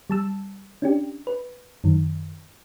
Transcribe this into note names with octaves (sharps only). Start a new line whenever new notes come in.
G3 A5 E6
C#4 D4 G4
B4
F#2 D#3